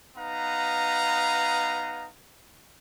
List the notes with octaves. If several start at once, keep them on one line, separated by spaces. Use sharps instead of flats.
B3 D#4 B4 F5 A#5